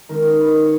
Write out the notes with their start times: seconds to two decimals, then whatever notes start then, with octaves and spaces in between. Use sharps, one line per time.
0.09 D#3 G#3 C#4 A#4
0.25 A#4
0.40 B4
0.56 C#5